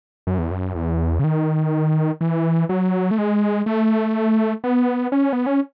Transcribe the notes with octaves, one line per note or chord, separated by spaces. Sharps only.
F#2
E2
F#2
E2
C#3
D#3
E3
F#3
A3
G#3
A3
B3
C#4
B3
C#4